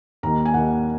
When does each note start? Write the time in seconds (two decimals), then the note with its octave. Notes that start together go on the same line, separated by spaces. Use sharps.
0.23 D#2 D#3 A#3 A#5
0.46 G#5
0.54 D#2 D#3 A#3 F#5